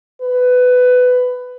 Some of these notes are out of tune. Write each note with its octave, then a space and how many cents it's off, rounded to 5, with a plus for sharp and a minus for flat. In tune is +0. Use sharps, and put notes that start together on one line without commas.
B4 +15